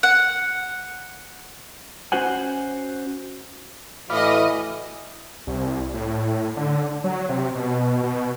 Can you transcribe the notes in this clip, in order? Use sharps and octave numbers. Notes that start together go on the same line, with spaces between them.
F#5
C#4 F#4 C5 F#5 G#5
A2 E3 F#4 D5 D#5 F5 B5 D#6
C2
A2
D3
F#3
C3
B2
B2